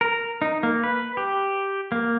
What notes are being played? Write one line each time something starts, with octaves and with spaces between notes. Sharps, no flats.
A#4
D#4
A#3
B4
G4
A#3